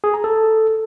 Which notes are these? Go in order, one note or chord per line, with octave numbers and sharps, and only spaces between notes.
G#4
A#5
A4